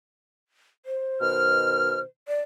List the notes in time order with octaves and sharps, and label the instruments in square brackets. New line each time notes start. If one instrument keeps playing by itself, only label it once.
[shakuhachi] C5
[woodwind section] B2 D#3 F6
[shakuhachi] D5